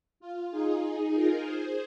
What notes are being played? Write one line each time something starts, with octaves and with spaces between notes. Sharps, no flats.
F4
D#4 G#4
D#4 G#4
F4 A#4
G#4 C5